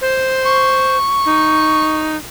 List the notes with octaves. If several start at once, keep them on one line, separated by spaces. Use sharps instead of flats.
C5
C#6
D#4